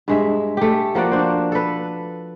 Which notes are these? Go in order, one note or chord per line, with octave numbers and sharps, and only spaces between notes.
G2 G#3 E5
A3 G4
F3 A#3 F#4 D5
D4 C5
A4 B4